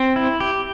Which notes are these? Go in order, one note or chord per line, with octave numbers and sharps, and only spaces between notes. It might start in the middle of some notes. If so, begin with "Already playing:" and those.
Already playing: C4
E4
G4